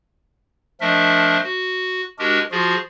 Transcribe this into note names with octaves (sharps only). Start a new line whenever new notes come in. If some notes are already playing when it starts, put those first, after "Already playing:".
F3 A3 D4 A#4 D#5 E5
F#4
G#3 D4 F#4 G4 A#4
F3 F4 F#4 G#4